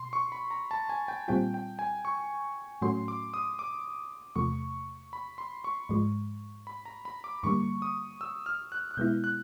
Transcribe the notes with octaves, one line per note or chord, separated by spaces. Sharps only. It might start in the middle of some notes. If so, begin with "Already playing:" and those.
Already playing: B2 C6
C#6
B5
A#5
A5
G#5
G5
A#2 G3 C4 F4 G5
G5
G#5
C#6
A2 F#3 A3 C#4 F#4 C6
D6
D#6
D6
E2 C3 F3 A3 C#6
B5
C6
C#6
G#2 F3 G#3
B5
A#5
B5
D6
G2 D3 G3 A#3 C#6
D#6
E6
F6
F#6
F#6
B2 G#3 B3 E4 G6
F#6